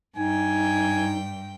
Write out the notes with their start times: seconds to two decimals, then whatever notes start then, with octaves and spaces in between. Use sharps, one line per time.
0.17 G2 D#4 G5 G#5